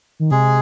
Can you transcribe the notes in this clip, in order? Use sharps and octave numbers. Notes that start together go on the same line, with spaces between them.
D#3
C3 G#3 G#4